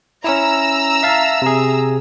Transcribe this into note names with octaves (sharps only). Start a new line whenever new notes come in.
C#4 E4 A#5 E6
E5 F5 A5
C3 G#4